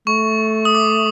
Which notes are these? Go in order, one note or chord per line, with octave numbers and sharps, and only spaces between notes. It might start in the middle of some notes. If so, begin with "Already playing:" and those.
A3 C#6
D#6
D6